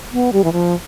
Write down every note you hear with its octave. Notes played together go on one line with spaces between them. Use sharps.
B3
G3
E3
F3